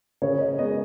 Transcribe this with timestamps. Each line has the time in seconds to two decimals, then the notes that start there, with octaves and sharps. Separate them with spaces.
0.22 C#3 C#5
0.40 D#5
0.58 G#3 B3 D#5